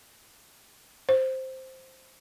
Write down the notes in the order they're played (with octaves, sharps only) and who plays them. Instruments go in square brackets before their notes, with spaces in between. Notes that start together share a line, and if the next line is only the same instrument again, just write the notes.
[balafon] C5